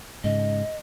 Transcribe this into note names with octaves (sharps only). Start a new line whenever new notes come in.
G#2 C#3 D#5